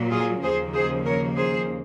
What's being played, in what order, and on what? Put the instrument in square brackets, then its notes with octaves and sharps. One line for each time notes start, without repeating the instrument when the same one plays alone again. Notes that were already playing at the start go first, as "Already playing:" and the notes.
Already playing: [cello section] A#2 F#3 A#3
F4 G#4
D#2 C#3 F3 A#3 G#4 C5
G#4 C5
A#4 C#5
G#4 C5